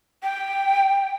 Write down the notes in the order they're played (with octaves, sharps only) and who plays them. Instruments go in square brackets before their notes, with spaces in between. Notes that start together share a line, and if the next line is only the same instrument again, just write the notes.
[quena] G5